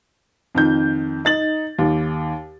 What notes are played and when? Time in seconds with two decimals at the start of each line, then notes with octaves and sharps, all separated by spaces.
0.55 F2 D#3 G6
1.25 D#4 A6 F#7
1.79 D#2